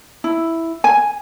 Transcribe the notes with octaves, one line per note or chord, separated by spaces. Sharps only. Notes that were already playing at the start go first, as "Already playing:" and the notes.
E4
G#5